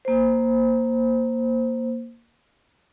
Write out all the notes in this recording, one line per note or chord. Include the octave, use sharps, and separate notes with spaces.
A#3 C5